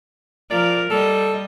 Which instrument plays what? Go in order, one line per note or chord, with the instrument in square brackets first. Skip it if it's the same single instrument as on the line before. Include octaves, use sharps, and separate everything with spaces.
[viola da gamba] F3 A#4 [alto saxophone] D5
[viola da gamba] G3 D#5 [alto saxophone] A4